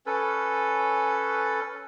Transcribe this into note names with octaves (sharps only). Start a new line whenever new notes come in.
C#4 A4 B4